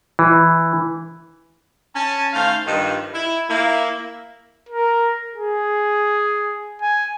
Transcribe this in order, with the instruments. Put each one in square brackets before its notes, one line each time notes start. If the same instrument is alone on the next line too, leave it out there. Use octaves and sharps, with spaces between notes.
[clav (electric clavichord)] E3
[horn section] C#4 G#5 A5
D#3 A3 C5 F5
G2 D#3 F3
E4
A#3 E4
[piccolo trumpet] A#4
G#4
G#5